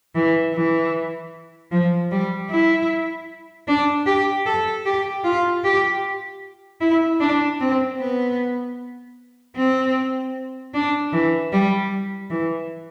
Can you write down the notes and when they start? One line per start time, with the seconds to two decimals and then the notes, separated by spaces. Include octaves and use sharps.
0.15 E3
0.53 E3
1.71 F3
2.11 G3
2.50 E4
3.68 D4
4.06 G4
4.46 A4
4.86 G4
5.24 F4
5.64 G4
6.81 E4
7.20 D4
7.60 C4
8.00 B3
9.56 C4
10.74 D4
11.13 E3
11.53 G3
12.30 E3